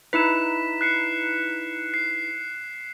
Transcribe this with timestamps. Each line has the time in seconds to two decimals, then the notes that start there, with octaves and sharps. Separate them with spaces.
0.13 D#4 E4 B4 B6 E7
0.81 F#6 C7 C#7
1.94 C7